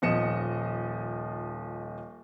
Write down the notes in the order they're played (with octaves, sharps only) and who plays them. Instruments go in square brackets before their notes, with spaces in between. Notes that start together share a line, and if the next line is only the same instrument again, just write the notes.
[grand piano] D#1 F3 D#5 C#7 E7